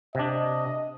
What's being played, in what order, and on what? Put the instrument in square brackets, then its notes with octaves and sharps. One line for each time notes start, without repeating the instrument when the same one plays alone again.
[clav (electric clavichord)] C3 D4 [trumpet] D#5